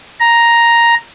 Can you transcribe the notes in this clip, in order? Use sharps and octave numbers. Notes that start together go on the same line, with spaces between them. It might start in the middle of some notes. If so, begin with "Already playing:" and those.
A#5